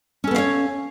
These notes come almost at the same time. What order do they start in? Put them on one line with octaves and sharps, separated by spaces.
C#4 A4 B3 F5 C#5